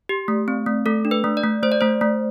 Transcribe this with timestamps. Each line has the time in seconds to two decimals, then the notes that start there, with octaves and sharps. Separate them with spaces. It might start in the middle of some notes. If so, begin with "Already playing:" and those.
0.09 G4
0.28 A3
0.48 C4
0.66 A3
0.86 A3 A4
1.05 D4
1.11 B4
1.24 A3
1.37 D5
1.44 A3
1.63 A3 C5
1.72 D5
1.81 A3 C5
2.01 A3